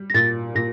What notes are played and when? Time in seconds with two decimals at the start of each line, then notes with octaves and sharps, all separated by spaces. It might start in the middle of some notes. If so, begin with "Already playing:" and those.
Already playing: G3
0.10 A#6
0.14 A#2 A6
0.55 A#2 A#6